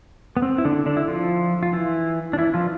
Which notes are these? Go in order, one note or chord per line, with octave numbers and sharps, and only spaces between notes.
B3
C4
E4
D3 D4
D3 D4
E4
F3 F4
F4
E3 E4
D4
E3 E4
F3 F4